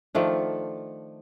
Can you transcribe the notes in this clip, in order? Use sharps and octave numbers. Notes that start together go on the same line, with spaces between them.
D#3 F3 A3 D4